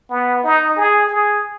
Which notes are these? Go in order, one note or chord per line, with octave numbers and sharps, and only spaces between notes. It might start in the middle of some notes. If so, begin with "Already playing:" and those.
B3
D#4
G#4
G#4